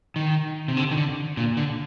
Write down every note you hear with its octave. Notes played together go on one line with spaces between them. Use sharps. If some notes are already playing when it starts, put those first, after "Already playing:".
D#3
C3
D3
D#3
D3
A#2
D3